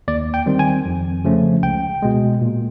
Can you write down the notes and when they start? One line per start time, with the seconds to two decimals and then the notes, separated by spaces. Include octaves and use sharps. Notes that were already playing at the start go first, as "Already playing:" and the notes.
0.08 D#2 D5
0.34 G5
0.46 D#3 G3 C4
0.59 G#5
0.85 F2
1.24 C#3 F3 A3 C#4
1.63 C#2 G5
2.02 B2 G#3
2.41 A#2